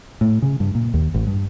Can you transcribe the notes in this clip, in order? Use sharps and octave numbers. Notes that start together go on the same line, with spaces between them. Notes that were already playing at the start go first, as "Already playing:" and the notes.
A2
C#3
G2
A#2
D#2
A1
G2